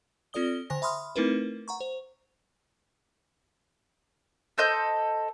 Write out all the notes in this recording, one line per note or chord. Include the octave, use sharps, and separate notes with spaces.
C4 F4 A4 D5 D#6 G7
D3 C5 G#5 A#6
E5 B5 C6 D#6 F6
A3 C4 D#4 E4 A#4 B4
F#5 A#5 C#6
C5
A4 C5 D#5 G6